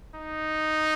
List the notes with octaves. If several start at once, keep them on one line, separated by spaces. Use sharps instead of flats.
D#4